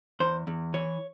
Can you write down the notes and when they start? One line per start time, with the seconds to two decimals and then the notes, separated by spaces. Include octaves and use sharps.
0.20 E2 C5
0.47 E2
0.74 E3 C#5